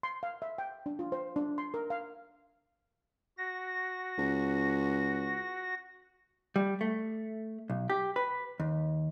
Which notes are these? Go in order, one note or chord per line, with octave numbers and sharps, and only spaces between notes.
C6
F5
E5
G5
D4
F4
C5
D4
C6
A#4
F5
F#4 A#6
C#2
G3
A3
B1
G4
B4
D#2